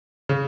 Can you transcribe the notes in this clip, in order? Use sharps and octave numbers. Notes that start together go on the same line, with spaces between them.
C#3